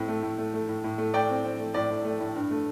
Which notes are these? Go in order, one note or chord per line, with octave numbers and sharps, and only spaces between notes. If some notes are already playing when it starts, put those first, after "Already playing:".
Already playing: A2 C4
A3
A2
A3
A3
A2
A2
A3
A2 D5 G5
C4
C4
A3
A2 D5
A2
A3
A2
G2
A3